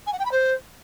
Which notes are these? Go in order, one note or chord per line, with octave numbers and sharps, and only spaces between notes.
G#5
F#5
G5
B5
C5